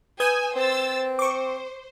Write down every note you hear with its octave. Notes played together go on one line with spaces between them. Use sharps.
B4 G#5 D#6 E6 G6 G#6
C4 C5 E6 A6
C5 C#6 D6